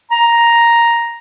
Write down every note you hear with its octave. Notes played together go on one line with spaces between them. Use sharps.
A#5